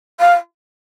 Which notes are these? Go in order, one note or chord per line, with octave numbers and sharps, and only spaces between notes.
F5